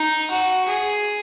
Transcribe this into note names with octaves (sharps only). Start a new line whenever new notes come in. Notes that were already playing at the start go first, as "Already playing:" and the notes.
Already playing: D#4
F#4
G#4